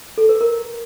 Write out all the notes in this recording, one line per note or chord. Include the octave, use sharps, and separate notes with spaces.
A4
B4
A#4